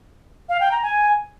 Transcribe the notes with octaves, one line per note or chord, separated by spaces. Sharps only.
F5
G5
A#5
G#5